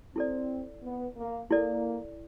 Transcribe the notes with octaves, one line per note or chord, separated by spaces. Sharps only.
C4 E4 A4 D5
B3
A#3
A#3 E4 A4 D5